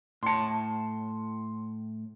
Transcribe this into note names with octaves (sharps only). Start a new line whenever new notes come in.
A2 A5 C6 C#7